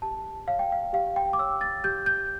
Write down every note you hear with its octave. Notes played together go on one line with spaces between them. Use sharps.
G4 A5
C#5 F5
G5
F5
G4 F5
G5
D6
C#5 E6
A6
G4 G6
G6